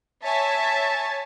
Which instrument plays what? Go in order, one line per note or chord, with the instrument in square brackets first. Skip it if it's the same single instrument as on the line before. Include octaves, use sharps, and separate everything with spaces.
[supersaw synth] C#5 G#5 [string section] E5 [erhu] A5